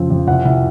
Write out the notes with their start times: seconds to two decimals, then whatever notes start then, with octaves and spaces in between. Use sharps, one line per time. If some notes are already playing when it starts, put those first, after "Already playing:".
Already playing: F2 C#3 F3 C4
0.10 F2
0.27 C2 F#5
0.45 C2